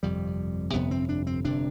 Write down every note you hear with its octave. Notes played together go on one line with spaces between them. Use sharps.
G1 F2 C3 G3
G1 F2 C3 B3
C4
D4
C4
G1 F2 C3 D4